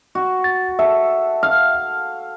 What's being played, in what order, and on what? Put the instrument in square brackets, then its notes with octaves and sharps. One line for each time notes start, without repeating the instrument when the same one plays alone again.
[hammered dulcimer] F#4
[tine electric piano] A6
[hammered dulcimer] A4 [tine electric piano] E5
[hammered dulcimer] F5